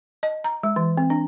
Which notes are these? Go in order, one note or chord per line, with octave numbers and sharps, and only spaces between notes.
D#5
A#5
G#3
E3
C4
D4